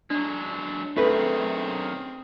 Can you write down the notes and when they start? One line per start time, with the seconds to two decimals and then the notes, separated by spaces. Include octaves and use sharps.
0.10 F#3 G#3 D4
0.96 F#2 D#3 A3 C4 G#4 B4